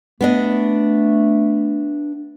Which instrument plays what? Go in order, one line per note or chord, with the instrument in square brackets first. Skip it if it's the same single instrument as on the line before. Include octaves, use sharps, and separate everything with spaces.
[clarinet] A3 [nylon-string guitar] B3 D4 D#5